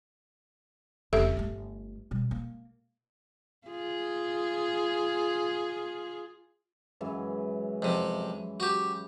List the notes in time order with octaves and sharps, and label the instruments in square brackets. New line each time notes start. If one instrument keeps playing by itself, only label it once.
[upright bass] F1 C#2 [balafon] G4 A4 E5
[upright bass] G1 A3
B2 G3
A#3
[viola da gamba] F4 G#4
[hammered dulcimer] F#2 E3 G#3
[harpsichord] F2 C3
F#4 G4